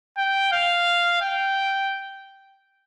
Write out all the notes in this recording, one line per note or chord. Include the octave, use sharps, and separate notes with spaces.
G5
F5
G5